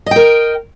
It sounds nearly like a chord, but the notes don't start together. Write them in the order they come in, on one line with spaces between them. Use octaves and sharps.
D#5 G5 A#4